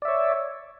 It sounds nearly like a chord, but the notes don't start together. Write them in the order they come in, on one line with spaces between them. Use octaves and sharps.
D5 E5 C#5